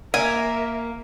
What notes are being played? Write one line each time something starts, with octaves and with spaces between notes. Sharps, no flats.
A#3 A#4 E5 G#5